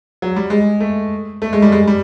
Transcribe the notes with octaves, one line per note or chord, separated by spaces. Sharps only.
F#3
G3
G#3
A3
A3
G#3
G3
G#3
G3